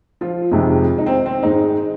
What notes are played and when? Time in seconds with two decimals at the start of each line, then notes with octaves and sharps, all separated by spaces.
0.21 F3 F4
0.51 F2 C3 D#3 G#3
0.98 D#4
1.06 C4
1.26 C4
1.43 G#2 D#3 G#3 D#4